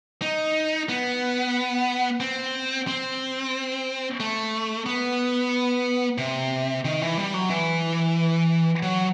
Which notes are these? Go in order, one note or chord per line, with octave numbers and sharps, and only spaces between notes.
D#4
B3
C4
C4
A3
B3
C3
D#3
E3
G3
F#3
E3
F#3